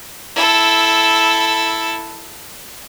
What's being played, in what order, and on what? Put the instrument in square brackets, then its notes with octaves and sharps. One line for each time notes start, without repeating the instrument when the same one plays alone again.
[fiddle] E4 A4